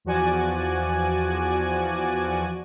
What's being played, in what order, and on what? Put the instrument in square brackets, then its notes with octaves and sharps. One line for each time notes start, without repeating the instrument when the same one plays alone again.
[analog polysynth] E2 F3 F#4 D5 G#5